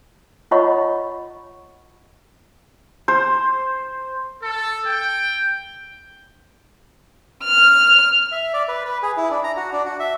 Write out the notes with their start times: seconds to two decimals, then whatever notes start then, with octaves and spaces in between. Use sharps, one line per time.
0.51 F4 C#5 D#5 F#5 B5 C#6
3.08 C5
4.43 A4
4.87 G5
7.44 F6
8.32 E5
8.54 D5
8.68 B4
8.85 B4
9.03 G#4
9.17 E4
9.31 D4
9.44 A#5
9.57 F#4
9.73 D4
9.85 F#4
10.00 E5